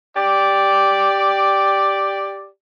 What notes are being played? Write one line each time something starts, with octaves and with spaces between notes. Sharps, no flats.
G4 D5